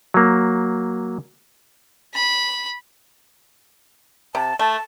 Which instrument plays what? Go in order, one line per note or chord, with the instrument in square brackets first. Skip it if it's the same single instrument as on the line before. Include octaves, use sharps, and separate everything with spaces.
[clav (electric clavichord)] F#3 A#3
[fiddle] B5
[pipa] C3 [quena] A5
[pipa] A3 [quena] A5